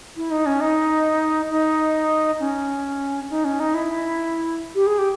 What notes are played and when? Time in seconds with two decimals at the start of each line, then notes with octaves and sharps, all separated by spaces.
0.17 E4
0.31 D#4
0.46 C#4
0.61 D#4
1.51 D#4
2.40 C#4
3.30 D#4
3.45 C#4
3.60 D#4
3.74 E4
4.75 G4
4.87 G#4
4.98 G4